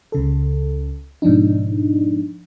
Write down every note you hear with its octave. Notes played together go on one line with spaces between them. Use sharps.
C#2 C#3 A4
G#2 B2 F3 D4 D#4